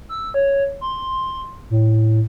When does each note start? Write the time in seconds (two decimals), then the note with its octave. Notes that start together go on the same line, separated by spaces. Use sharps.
0.09 E6
0.34 C#5
0.81 C6
1.70 A2